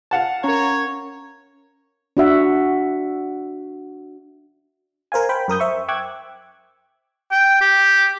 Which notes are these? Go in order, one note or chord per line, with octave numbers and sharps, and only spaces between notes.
F5 F#5 A5
C#4 A#4 C#5 A#5
D4 F#4 E5 F#5
A#4 C5 F5 G#5
C5 G5 B5
F#2 A#4 D#6 G6
C5 E5 C#6
G5 C#6 D6 E6 F#6 G#6
G5
G4